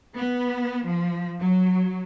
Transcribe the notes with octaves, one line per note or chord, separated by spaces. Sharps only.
B3
F3
F#3